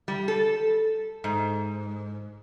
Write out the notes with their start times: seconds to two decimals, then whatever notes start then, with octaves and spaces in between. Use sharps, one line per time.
0.08 G3
0.28 A4
1.24 G#2